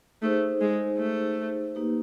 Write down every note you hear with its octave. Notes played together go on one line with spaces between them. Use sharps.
A3 D#4 G#4 C5
G#3
A3
A#3 D#4 G4 B4